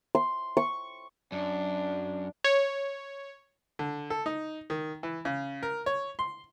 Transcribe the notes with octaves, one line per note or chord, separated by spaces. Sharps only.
C6
C#6
F#2 D4
C#5
D3
A4
D#4
D#3
E3
C#3
A#4
C#5
C6